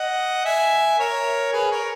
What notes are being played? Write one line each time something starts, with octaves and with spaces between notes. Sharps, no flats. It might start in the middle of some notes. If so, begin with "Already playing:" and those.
Already playing: D#5 F#5
E5 G#5
A#4 C#5
G#4 B4
A#4 C#5